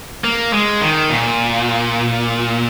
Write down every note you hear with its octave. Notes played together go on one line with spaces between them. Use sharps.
A#3
G#3
D#3
A#2